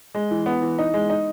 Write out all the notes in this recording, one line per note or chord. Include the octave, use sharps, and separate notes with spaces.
G#3
E3
B3
E3
D#4
G#3
D#4